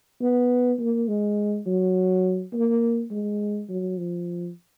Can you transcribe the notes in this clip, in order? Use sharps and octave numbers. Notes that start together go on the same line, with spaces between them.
B3
A#3
G#3
F#3
A#3
G#3
F#3
F3